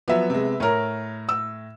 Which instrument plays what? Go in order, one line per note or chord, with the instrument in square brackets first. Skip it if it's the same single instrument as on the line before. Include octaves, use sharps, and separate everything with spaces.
[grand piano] F3 F#3 [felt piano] B3 E5
[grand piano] C3 G#3
[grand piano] A2 [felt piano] A#4 C#5
[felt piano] E6